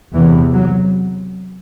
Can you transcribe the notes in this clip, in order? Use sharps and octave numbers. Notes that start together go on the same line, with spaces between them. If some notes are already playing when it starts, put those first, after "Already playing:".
E2 C3 E3
F#3